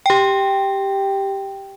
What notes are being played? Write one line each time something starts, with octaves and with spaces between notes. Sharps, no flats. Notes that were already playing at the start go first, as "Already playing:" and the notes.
G4 G5